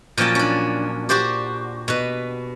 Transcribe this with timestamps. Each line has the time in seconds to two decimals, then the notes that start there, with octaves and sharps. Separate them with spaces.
0.18 A#2 F3 F#3 C#4 G5 A5
0.35 C#4 D4
1.09 F#4 G4 C5 D5
1.88 B2 B4